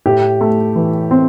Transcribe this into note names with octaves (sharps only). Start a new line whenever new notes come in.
A2 G4
A3
E3
C4